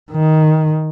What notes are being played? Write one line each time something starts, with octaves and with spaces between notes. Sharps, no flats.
D#3